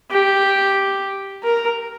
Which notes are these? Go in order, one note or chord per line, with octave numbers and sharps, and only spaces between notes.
G4
A#4